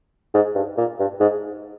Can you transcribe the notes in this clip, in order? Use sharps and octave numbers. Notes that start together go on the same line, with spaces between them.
G#2
G2
A#2
G2
G#2